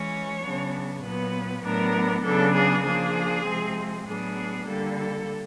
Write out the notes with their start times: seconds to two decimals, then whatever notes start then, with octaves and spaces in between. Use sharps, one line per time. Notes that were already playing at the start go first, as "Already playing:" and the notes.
Already playing: E3 G#3 C#4 C#5
0.42 C#3 F#3 B3 D4
1.03 A#2 F#3 B3 B4
1.64 A2 F#3 B3 D4 A#4
2.24 C#3 F#3 B3 D4 A4
2.55 G#4
2.85 F3 A#3 D4 G#4
3.46 C3 F3 G#3 C4
4.06 A2 F#3 B3 D4 G#4
4.67 D3 G3 A#3 A4
4.98 A4